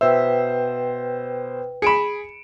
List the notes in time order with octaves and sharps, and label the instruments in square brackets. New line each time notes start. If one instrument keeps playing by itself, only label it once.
[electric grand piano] B2 C5 E6 [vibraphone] B4 G5 [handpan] E5
[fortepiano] G#4 B5 [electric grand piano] C#7 D7 E7